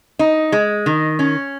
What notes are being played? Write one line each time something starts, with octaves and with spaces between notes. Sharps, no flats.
D#4
G#3
D#3
C#4